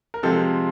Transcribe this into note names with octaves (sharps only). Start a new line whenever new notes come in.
A#4
C3 F3 G#3 C4 A4